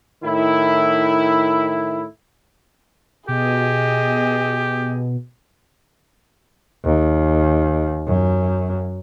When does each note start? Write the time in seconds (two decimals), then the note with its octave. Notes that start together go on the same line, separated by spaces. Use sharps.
0.23 A2 D#3 E4
3.28 B2 G4 G#4 D#5
6.84 D#2
8.07 F#2